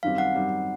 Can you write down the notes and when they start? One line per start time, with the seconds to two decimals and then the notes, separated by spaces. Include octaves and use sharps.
0.03 F#2 D#3 G3 C4 F5
0.18 F#5
0.34 F#2 D#3 G3 C4